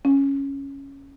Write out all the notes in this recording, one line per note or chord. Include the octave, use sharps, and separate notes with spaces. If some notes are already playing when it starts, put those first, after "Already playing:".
C#4